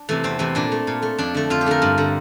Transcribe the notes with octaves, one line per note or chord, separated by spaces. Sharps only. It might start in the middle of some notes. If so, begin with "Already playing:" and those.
Already playing: D4
C3 E3 A3
E2 C4
C3 E3 A3
A#2 D4
A3
A#2
A3
F2 D4
D3 A3
F2 F4
G4
D3 A3 A#4
G2
D3 G3